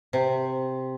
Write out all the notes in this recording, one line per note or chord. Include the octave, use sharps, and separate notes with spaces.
C3